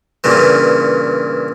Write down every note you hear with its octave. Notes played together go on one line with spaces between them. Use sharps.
G2 A#2 C#3 E3